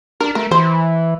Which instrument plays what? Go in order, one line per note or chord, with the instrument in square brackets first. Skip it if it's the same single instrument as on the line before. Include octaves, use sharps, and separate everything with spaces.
[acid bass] D4 [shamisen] A#4
[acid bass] A3 [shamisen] A#4
[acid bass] E3 [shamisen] C5